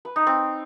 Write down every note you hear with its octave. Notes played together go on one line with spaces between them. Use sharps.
B4
D#4
C4